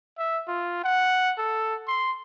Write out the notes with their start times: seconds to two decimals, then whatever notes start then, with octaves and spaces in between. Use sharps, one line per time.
0.18 E5
0.48 F4
0.84 F#5
1.38 A4
1.88 C6